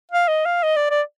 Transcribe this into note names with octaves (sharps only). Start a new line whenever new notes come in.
F5
D#5
F5
D#5
D5
D5